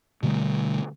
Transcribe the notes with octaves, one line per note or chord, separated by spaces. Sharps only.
B2 D3 G3 A3